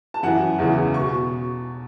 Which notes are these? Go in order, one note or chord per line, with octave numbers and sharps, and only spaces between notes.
A5
F#2 E3 F#5
E2 C#3 E3
B2 C#6